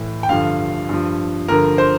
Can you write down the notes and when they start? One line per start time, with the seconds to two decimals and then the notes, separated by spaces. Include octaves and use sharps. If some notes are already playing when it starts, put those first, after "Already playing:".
Already playing: A2 E3
0.23 G5
0.29 G2 D3 F3 F5
0.89 G2 F3
1.48 G2 D3 F3 A#4
1.78 C5